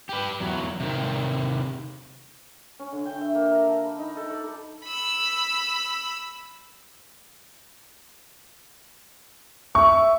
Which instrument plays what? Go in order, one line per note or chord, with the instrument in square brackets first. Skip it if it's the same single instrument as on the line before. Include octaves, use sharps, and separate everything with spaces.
[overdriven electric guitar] G4 B4
E2 F#3
C3 D#3
[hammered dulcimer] C#4
D3
G5
E5
A#3
A#4
A5
B5
D#4
A4
D5
A4
[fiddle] B5 E6
[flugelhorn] E5 [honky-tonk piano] C#6